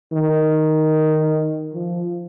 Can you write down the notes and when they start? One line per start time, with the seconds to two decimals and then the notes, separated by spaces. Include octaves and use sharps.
0.13 D#3
1.74 F3